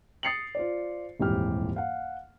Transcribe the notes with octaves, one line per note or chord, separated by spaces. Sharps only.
D#6 A6 C7 C#7 F7 F#7
F4 C5 D5
D#1 F2 G#2 E3 G4 F6
F5 F#5